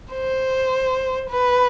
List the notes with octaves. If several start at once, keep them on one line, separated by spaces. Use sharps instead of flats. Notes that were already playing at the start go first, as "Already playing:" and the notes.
C5
B4